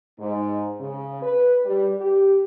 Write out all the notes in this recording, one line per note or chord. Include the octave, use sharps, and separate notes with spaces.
G#2
C#3
B4
G3
G4